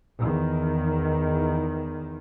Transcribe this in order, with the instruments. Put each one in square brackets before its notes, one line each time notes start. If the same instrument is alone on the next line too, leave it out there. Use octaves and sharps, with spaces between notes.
[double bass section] E2 D#3